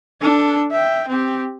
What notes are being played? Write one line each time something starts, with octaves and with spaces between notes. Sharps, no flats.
D4 A4
E5 G5
C4 G4